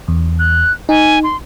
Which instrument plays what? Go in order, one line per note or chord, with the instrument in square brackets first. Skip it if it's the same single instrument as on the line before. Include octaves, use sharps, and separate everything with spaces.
[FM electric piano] E2
[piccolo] F#6
[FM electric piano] D#4 [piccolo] G#5
[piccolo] C6